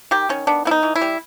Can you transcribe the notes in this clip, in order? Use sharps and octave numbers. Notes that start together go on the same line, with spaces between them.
D#3 G4
D#3 C#4
B3 D4
B3 E4
D#4
E3
E4
G3